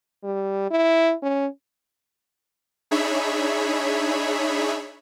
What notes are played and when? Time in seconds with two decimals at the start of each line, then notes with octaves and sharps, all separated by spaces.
0.24 G3
0.70 E4
1.23 C#4
2.91 D4 D#4 G#4 C#5 E5 B5